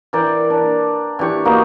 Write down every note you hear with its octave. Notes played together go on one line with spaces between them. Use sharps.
E3 A#4 D5 G5
D4
E3 D4 G4 C#6
A#3 B3 D#4 F#4